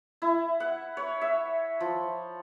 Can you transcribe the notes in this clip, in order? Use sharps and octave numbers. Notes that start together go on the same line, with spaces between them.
E4
F#5
C#5
E5
F3